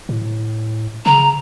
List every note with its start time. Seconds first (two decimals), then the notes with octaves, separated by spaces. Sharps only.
0.09 A2
1.06 C#3 A#5